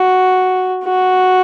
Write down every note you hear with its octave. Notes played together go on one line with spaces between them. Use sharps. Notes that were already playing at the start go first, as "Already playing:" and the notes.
Already playing: F#4
F#4